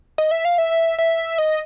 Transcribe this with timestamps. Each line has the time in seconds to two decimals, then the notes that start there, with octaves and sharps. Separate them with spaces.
0.18 D#5
0.31 E5
0.45 F5
0.58 E5
0.98 E5
1.38 D#5